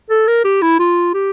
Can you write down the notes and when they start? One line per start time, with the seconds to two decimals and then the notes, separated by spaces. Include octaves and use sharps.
0.10 A4
0.27 A#4
0.44 G4
0.62 E4
0.79 F4
1.14 G4